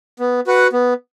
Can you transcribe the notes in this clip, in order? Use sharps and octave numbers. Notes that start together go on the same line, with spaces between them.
B3
F#4 B4 F#5
B3